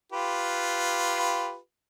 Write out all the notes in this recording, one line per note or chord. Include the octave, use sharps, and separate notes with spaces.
F4 G4 B4